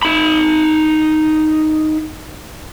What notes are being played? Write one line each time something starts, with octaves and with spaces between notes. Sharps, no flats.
D#4 B5